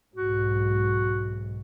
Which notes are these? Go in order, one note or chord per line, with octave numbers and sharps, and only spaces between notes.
B1 G#2 F#4